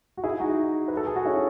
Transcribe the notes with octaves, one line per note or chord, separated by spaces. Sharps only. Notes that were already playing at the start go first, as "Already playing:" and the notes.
F#4
E4 G#4
D#4 F#4
B4
A4
G#4
F#4
C#4 E4